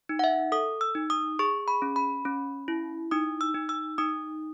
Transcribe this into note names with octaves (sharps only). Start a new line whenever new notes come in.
D#4
F#5
E5
A4 D#6
E6
D#4
D#6
G#4 C#6
B5
C#4
B5
C#4
E4
D#4 D#6
E6
D#4
E6
D#4 D#6